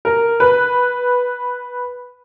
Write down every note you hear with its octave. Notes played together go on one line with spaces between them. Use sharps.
A#4
B4